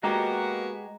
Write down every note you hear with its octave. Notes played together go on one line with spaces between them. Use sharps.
G#3 A#3 B3 F#4 G4 A#5